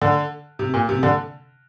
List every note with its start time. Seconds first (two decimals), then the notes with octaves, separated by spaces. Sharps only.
0.02 D3
0.59 C3
0.74 A#2
0.89 C3
1.03 D3